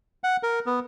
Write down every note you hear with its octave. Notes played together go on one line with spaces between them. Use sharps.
F#5
A#4
B3